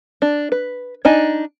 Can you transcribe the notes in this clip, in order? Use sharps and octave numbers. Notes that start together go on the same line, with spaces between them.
D4
B4
D4 D#4 G#5